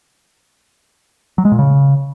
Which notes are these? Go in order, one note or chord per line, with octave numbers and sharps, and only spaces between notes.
F#3
G#3
A#2
C#3